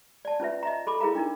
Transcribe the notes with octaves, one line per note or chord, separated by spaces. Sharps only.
D5 A5
C#4 F4 B4 E5
D#5 E5 A#5
A4 B5 D6
E4 G#4 A#4 F5 A#5
D4 D#4 A#4